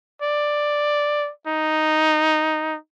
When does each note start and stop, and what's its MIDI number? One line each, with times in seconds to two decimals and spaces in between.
0.22 1.30 74
1.47 2.77 63